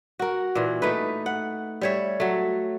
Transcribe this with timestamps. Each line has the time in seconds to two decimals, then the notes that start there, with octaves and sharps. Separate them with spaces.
0.19 F#4 A#4
0.55 A#2 E3
0.82 A3 D#4 B4
1.26 F#5
1.81 G3 C#5 E5
2.20 F#3 A3